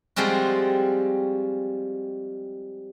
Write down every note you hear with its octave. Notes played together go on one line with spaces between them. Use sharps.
F3 G3 G#3 C4 F#4